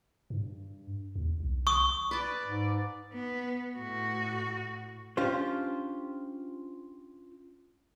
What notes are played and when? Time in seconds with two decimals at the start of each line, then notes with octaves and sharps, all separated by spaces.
0.30 G2
1.16 D#2
1.40 B1
1.67 C#6 D#6
2.11 B4 D5 A5
2.43 G#2
3.13 B3
3.78 A2 F#4
5.17 C#4 D4 F4 G4 C5